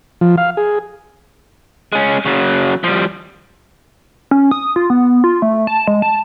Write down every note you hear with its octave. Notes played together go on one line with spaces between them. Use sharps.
F3
F5
G#4
G#3 C#4
C#3 F#3
F3 G3
C#4
D#6
F4
B3
F4
A3
A5
G#3
A5